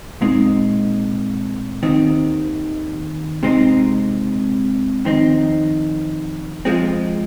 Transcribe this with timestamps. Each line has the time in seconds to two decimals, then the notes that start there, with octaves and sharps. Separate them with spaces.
0.21 A#2 G#3 C4 D#4
1.83 D#2 D#3 C4
3.43 C3 G#3 C4 D#4
5.04 F2 D#3 C4 D#4
6.65 F2 F3 G#3 C4